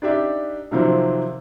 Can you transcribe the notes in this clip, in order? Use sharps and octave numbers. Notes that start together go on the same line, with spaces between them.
D4 D#4 G4 D5 E5
C3 D#3 F3 F#3 A#3 C4